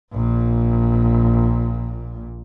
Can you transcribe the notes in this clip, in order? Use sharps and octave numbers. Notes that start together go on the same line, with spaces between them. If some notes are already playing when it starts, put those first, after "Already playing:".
A#1 A#2